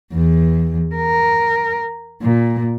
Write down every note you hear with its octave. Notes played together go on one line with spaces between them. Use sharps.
E2
A#4
A#2